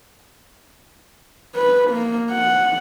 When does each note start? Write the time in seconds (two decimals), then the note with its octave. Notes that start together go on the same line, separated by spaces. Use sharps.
1.56 B4
1.91 A#3
2.32 F#5